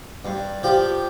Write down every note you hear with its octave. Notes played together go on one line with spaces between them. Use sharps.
G2
F3 G4